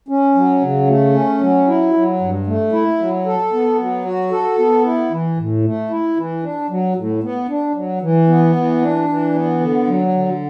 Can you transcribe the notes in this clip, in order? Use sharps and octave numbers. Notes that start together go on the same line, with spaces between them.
C#4
F#3
C#3
A3
C#4
F#3
E4
F#3
G2
A3
E4
F#3
A4
B3
F#3
F#4
A4
B3
E4
E3
A2
A3
E4
E3
D4
F#3
A2
B3
D4
F#3
E3
B3
E3
D4
E3
B3
D3
F#3
D3